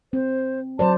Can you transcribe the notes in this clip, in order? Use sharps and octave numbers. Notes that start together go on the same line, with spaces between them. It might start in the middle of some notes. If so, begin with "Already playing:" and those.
C4 C5
F#3 C5 D5 A5